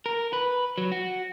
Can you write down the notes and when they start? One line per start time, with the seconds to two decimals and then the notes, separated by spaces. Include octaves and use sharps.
0.06 A#4
0.33 B4
0.78 F#3
0.92 F#4